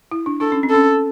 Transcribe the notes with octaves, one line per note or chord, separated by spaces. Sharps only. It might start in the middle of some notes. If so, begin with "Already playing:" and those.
E4
D4
D4 A4
C#4
C4
C#4 A4